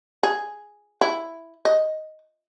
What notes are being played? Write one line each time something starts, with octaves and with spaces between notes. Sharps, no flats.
G#4
E4
D#5